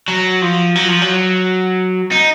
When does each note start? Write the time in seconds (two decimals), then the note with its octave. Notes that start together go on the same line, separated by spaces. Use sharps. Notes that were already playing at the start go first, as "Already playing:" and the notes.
0.08 F#3
0.42 F3
0.75 F#3
0.88 F3
1.02 F#3
2.12 D#4